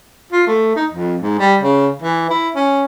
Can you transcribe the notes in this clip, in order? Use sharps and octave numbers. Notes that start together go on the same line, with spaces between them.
F4
A3
D#4
F2
G#2
G3
C#3
E3
E4
C#4